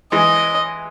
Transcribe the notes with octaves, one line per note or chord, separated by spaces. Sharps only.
E3 G#3 D#5